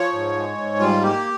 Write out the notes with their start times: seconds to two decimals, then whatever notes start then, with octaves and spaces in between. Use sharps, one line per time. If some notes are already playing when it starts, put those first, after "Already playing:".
Already playing: F3 C#5
0.13 G#2
0.35 G#3
0.58 G#2
0.80 G3 F4
1.02 A#3 G4